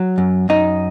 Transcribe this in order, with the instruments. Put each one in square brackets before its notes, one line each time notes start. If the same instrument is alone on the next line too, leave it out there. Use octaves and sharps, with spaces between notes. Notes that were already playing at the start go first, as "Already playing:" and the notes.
Already playing: [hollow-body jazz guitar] F#3
F#2
F#2 D#4